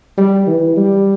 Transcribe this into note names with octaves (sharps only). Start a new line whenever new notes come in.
G3
E3
G3